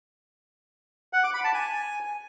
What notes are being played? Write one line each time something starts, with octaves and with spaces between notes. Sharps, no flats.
F#5
D6
B5
A5
G#5